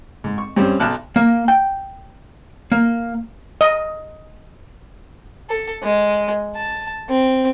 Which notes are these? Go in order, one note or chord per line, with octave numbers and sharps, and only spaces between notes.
G#2
C#6
G2 G3 C4 C#4
B1 A5 F6 F#6
A#3
G5
A#3
D#5
A4
G#3
A5
C4